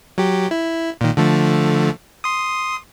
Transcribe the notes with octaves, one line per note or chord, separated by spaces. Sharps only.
F#3 G4
E4
A#2 D#3
D3 F3 A3
C6 D#6